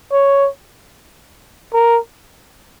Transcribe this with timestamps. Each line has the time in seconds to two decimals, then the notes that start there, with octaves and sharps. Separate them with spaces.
0.12 C#5
1.74 A#4